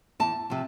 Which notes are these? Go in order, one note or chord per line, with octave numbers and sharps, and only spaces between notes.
E2 A5
C3 F3